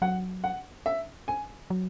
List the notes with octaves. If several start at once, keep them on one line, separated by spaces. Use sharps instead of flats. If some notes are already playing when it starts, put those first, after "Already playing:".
F#3 F#5
F#5
E5
G#5
F#3